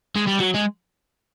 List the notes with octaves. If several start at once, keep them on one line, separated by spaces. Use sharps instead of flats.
G#3
G3
F#3
G#3